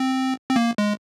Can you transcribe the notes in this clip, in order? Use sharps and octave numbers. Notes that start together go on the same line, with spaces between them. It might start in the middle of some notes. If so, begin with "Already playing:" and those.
Already playing: C4
C4
A#3
G#3